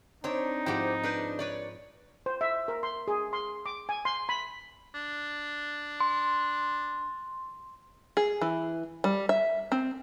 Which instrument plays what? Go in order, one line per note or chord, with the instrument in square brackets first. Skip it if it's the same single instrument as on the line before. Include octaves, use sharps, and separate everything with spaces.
[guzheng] C4 [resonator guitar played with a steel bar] D4 C#5 [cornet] D#4
[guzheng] G#2 F3 [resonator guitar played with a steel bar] E4 G4 F#5
[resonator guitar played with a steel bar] D4 B4 C5
B4 C#5 D5
[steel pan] C5
E5
A#4
C6
G#4
C6
D6
G#5
C6
B5
[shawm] D4
[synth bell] C6
[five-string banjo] G#4
E3
G3
E5
C4